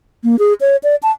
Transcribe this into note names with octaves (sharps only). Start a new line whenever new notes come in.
A#3
G#4
C#5
D5
A5